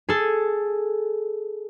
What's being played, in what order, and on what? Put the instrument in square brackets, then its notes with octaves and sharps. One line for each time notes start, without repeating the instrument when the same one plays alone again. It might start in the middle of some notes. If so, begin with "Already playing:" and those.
[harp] G#4 A4